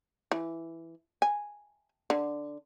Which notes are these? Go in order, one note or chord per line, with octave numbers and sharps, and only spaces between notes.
E3
G#5
D3